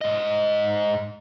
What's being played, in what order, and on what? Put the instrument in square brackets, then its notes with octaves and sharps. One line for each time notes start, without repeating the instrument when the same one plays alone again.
[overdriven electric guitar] G#2 D#5